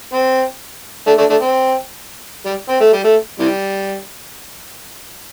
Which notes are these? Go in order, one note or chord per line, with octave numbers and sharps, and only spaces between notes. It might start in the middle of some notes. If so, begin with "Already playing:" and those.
C4
A3 D4
A3 D4
A3 D4
C4
G3
C4
A3
G3
A3
C3 E3 G3